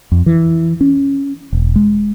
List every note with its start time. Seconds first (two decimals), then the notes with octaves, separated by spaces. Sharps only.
0.12 F2
0.26 E3
0.81 C#4
1.53 E1
1.76 G#3